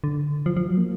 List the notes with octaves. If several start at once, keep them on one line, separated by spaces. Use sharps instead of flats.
D3
F3
F3
F#3
A#3